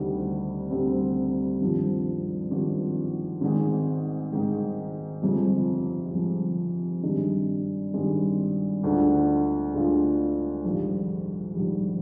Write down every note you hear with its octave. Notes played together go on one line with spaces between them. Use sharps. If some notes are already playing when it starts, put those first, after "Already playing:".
Already playing: D2 C3 D#3 G3 C4
D2 C3 D#3 G3 C4
G#1 G2 F3
G#1 G2 F3
G#1 G#2 D#3 G#3
G#1 G#2 D#3 G#3
G1 F2 C3 F3 G#3
G1 F2 C3 F3 G#3
G#1 G2 D#3 G#3
G#1 G2 D#3 G#3
D2 D3 G#3 D4 F4
D2 D3 G#3 D4 F4
A#1 G#2 D#3 G3
A#1 G#2 D#3 G3